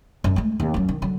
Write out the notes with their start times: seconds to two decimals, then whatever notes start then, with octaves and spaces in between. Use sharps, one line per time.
0.24 F#2
0.36 G#3 A3
0.60 D#2
0.74 F#2 F#3
0.89 D#3
1.02 D3 F#3